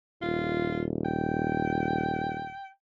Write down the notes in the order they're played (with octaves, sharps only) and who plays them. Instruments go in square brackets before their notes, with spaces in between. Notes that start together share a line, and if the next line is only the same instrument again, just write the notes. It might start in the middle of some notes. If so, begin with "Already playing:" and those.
[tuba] D#1 [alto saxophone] F4
[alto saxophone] G5